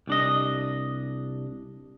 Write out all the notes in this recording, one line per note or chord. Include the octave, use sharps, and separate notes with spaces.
C2 D4 D#5